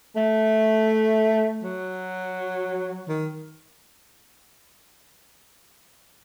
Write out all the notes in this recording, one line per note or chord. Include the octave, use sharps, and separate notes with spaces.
A3
F#3
D#3